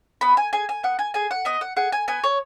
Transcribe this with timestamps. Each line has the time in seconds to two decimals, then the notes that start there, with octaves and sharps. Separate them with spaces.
0.21 B3 B5
0.37 G#5
0.53 G#4 G#5
0.69 G#5
0.83 B3 F#5
0.99 G#5
1.14 G#4 G#5
1.31 F#5
1.45 B3 D#5
1.61 F#5
1.76 G#4 F#5
1.92 G#5
2.08 B3 G#5
2.24 C#5